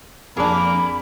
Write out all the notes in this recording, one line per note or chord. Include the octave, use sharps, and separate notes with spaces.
F2 A#3 D4 G#4 A#4 B5 D6